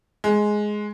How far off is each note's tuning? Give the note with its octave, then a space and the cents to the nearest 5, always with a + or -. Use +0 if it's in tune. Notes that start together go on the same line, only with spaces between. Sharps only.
G#3 +10